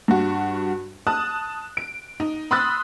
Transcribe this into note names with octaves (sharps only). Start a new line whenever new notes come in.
G2 F#4
A5 D#6 F#6
D7
D#4
B5 C6 D#6 E6 F#6 A6